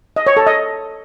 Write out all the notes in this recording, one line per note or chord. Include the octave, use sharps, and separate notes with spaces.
D#5
C#5
A4
D#5